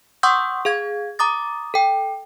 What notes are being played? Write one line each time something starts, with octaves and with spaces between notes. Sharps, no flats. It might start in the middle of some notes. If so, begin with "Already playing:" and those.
F#5 C6 C#6 D#6 E6 G6
G#4 F5 G#6
A#5 D6 D#6 A6
A4 G5